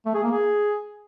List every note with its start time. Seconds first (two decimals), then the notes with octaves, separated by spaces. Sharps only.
0.06 A3
0.14 G#4
0.23 A#3
0.32 G#4